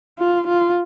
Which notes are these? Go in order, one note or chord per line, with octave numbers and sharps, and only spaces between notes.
F4
F4